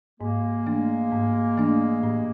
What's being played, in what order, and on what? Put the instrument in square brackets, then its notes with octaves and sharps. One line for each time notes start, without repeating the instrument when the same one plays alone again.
[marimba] G#2 [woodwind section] G#3 A#3
[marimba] E3 A3 D4
G#2
E3 A3 D4
A2